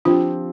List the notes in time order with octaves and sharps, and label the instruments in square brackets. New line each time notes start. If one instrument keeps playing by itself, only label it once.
[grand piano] F3 C4 G4 [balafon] D4 F4